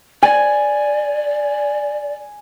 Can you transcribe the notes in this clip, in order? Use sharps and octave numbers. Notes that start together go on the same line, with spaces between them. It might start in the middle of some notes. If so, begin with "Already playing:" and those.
D5 G#5